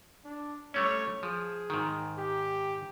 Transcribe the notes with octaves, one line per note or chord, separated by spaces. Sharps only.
D4
G3 A3 C#4 C#5
F3 G#4
G#2 D#3
G4